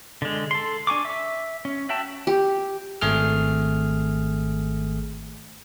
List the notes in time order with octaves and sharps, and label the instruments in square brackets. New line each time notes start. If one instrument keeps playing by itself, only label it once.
[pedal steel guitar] D3 G#3
A4 C6
D4 G#5 C#6 D6
E5
C#4
F#4 E5 G5 A5
[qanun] G4
[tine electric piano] G#1 A3 G#4 F6